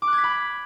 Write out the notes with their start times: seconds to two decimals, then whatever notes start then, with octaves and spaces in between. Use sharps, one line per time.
0.02 D6
0.07 F#6
0.13 G#6
0.18 B6
0.24 B5